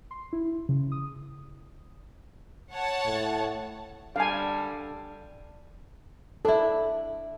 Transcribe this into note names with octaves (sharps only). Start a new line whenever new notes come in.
C6
E4
C#3
D#6
C#5 F#5 A5
A2
D3 G3 A4 F5 G#5
D4 E4 A4